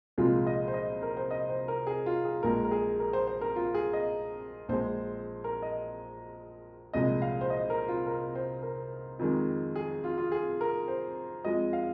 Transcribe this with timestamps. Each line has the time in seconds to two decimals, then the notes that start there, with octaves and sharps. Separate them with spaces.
0.18 C2 A#2 F3 G#3 F4
0.47 D#5
0.68 C5
0.74 D#5
1.03 A#4
1.17 C5
1.31 D#5
1.50 C5
1.68 A#4
1.87 G#4
2.06 F4
2.25 G#4
2.43 A#1 A#2 G#3 A#4
2.65 A#4
2.71 G#4
3.00 A#4
3.13 C5
3.27 C5
3.41 A#4
3.56 F4
3.74 G#4
3.93 D#5
4.68 A#1 A#2 G#3 C5
5.44 A#4
5.62 D#5
6.93 C2 A#2 F3 G#3 D#5
7.22 F5
7.41 C5
7.50 D#5
7.70 A#4
7.88 F4
8.07 A#4
8.35 C5
8.63 A#4
9.19 F2 D#3 G#3
9.76 G#4
10.04 F4
10.18 F4
10.32 G#4
10.61 A#4
10.88 C5
11.45 F2 F3 G#3 D#5
11.73 F5